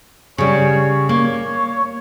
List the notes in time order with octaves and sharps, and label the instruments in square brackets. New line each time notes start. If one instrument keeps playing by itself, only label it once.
[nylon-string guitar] C#3 G3 [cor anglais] C#5
[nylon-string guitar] A#3 [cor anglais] C#5